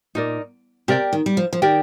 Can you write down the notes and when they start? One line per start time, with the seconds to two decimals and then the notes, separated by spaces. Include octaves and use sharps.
0.15 A#2 D#4 A#4 D5
0.88 C3 G4 A#4 D5 G5
1.13 D#3
1.26 G3
1.37 F3
1.53 F3
1.62 D#3 G4 A#4 D5 G5